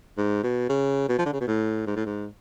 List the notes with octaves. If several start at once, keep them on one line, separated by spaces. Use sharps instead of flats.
G#2
B2
C#3
B2
F3
D3
C#3
B2
A2
G#2
A2
G#2